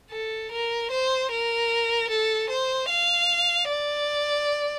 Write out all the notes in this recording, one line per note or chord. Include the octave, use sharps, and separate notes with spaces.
A4
A#4
C5
A#4
A4
C5
F5
D5